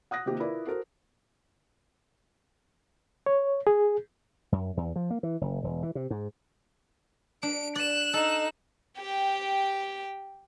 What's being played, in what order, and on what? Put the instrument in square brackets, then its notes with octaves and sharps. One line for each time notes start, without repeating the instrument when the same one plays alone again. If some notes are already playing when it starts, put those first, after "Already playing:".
[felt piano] F#5 D#6 F#6 A#6
C3 D#3 A#3 F4 G4
E4 F4 A#4 B4 D5
F#4 A4 A#4 C5
[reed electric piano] C#5
G#4
[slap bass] F#2
E2
F3
A#3
E3
F#1
E1
E3
C3
G#2
[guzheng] D4 [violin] D7
[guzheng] D5 [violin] F#6 E7
[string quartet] D#4 [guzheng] A4
[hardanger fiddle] G4 G5